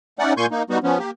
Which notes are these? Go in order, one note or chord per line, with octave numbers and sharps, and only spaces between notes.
A3 C#4 D#4 D5 F#5
A#2 A#3 G#5 C6 C#6 G6
A#3 D#4
G3 B3 D#4 F#4
F3 B3 C#4
A#3 G4